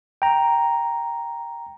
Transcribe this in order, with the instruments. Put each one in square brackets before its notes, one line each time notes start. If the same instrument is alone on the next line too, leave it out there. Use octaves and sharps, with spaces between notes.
[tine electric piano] G5 A#5